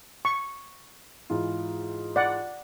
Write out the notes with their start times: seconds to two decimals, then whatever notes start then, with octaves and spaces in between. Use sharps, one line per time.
0.25 C#6
1.30 G#2 E3 F4
2.16 D5 F#5